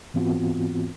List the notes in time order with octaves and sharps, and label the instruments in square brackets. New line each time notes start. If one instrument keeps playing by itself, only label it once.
[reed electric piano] G#2 E3 B3 C4 F4 F#4